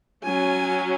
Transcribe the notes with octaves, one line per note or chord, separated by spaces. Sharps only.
F#3 C#4 G#5